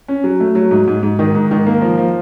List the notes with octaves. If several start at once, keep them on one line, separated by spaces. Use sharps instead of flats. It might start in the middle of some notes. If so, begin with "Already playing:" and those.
C#4
F#3
A3
F#3
G#2
G#2
G#2
D#3
G#2
D#3
A#3
F3
F3